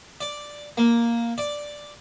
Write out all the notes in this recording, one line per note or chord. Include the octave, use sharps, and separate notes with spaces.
D5
A#3
D5